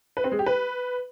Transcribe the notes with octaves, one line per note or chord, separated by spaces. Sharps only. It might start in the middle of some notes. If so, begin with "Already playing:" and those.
B4
C4
G#3
G4
B4